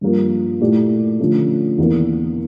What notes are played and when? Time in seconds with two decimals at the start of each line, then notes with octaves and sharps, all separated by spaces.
0.01 G2 F3 A#3
0.60 A#2 A3 E4 G4 D5
1.20 D3 F3 A3 C#4
1.78 E2 E3 A#3